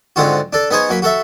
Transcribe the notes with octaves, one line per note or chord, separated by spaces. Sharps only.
G#2 D3 C4 F4 F#4
D4 A4
B3 D#4 G#4 C5 C#5
F#3 A#3 B5
F#4 A4 E5